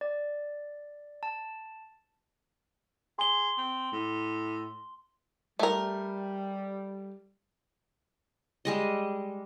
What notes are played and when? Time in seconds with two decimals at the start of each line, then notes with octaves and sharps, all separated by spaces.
0.01 D5
1.23 A5
3.19 G#4 C6 G7
3.58 C4
3.92 A2
5.59 G3 A3 A#4
8.65 G3 G#3 D#5